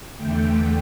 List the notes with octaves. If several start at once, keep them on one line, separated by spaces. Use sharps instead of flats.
E2 D3 A3 G5